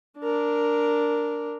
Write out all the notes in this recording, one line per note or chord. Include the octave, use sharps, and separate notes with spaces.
D4 A#4